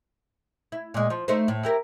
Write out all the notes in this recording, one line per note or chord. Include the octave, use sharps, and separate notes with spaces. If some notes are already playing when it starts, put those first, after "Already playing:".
E4
A#2 G#3
F3
A3 D#4 C5
A2
E4 G4 A#4